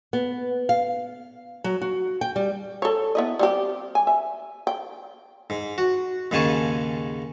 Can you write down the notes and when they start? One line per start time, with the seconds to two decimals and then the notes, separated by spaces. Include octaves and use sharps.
0.13 B3
0.69 F5
1.64 F#3
1.81 F#4
2.21 G5
2.36 G3
2.82 A4 C#5
3.15 B3 E4 D#5
3.39 G3 C4 G4
3.95 G#5
4.07 E5
4.67 G5
5.50 G#2
5.78 F#4
6.31 D#2 G#2 C#3 G#5 A5 C#6